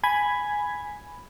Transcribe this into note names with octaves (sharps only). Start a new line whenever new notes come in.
G#5 B5 G#6